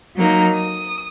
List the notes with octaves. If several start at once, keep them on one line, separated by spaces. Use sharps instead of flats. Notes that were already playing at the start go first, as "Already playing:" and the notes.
F#3 A#3 D#4
D#6